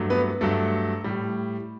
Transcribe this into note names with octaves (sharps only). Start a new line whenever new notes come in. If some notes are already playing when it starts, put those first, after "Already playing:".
Already playing: G2 F#3 A3
B3 B4
G2 F#3 A3 A4
A2 G3